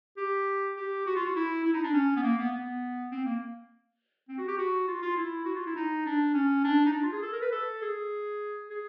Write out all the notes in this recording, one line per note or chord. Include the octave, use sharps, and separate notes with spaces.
G4
G4
F#4
F4
F#4
E4
E4
D#4
D4
C#4
B3
A#3
B3
B3
C4
A#3
C4
F#4
G4
F#4
F4
F4
E4
F#4
F4
E4
D#4
D4
C#4
D4
D#4
D4
F4
G#4
A4
A#4
B4
A4
G#4
G#4